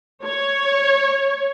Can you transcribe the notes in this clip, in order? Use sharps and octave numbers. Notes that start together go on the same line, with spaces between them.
C#5